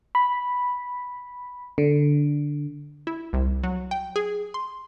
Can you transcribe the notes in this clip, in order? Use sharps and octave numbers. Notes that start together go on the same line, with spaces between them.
B5
D3
E4
C2
F#3
G5
G#4
C6